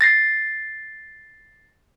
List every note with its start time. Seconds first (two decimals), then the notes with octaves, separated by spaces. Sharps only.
0.01 A6 A#6 C7